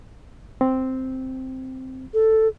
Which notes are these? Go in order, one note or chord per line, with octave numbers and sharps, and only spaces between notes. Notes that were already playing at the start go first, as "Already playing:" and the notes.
C4
A4